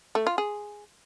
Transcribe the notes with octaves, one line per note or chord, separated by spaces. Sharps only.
A3
F4
G#4